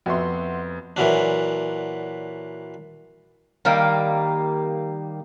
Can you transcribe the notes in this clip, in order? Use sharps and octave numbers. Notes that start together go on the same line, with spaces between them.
F2 B3 F#4 E5 C6
A#2 E3 F#3 D4
D#3 G3 A#3